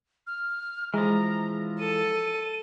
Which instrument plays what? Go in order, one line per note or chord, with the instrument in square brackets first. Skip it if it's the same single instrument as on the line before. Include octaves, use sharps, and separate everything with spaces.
[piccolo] F6
[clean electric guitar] E3 F3 [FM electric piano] G#3 [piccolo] A#5
[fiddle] A4 [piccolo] D#7